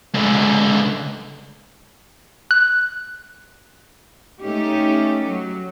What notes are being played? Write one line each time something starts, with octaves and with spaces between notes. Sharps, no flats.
C#2 D3
F#6
A3 C#4 D#4 G4
F#3